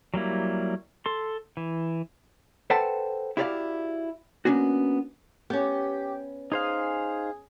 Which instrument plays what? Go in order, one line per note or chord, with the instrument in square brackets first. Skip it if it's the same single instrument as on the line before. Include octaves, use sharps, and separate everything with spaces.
[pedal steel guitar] F#3 G3 A#3 E4
A4 C6
E3
[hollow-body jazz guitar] A4 B4 C5 F#5 G5 A5
E4 F#4 G4 C#5 D5 F5
A#3 B3 C#4 D4 F#4
[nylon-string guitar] B3 C#4 [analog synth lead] G4
[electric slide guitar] D#4 C5 F5 [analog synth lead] G#4